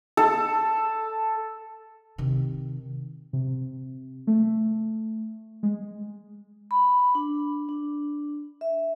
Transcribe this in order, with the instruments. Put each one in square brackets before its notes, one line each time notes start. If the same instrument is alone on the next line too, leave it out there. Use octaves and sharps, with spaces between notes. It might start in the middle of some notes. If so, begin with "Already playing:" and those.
[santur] A4
[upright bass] C3 D#3
[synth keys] C3
A3
G#3
[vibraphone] B5
D4
D4
E5